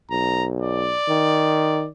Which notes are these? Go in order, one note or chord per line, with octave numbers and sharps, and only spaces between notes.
B1 A#5
D5
D#3